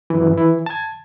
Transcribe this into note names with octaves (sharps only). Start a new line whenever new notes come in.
F#2 E3
E3 E4
A5 G#6